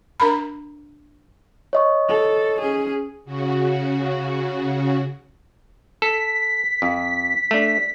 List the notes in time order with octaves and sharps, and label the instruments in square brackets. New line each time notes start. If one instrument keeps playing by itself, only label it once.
[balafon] D4 A#4 A#5 B5
[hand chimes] C#5 D#5 C#6
[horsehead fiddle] A4
C#4 G#4
[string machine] C#3 F#4
[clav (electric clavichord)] A4 [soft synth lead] B6
[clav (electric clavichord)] F2
A3 D4